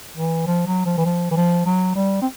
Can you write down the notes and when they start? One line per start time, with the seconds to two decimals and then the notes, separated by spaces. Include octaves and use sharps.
0.17 E3
0.46 F3
0.66 F#3
0.86 F3
0.97 E3
1.05 F3
1.31 E3
1.36 F3
1.65 F#3
1.95 G3
2.21 C4